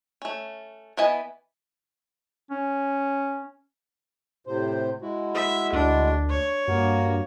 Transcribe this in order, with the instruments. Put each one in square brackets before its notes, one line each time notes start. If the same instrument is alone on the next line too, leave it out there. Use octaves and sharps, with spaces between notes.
[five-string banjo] A3 C#4
E3 B3 E4 D#5 G#5
[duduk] C#4
[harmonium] A2 C3 C5
G#3 E4 F#4
[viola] E5
[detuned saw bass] D2 [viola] D4
[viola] C#5
[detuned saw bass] G2 [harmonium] A#3 F#4 A#4